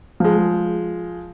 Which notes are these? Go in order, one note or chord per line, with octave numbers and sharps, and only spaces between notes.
F3 G#3